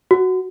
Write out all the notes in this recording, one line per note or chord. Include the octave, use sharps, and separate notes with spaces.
F#4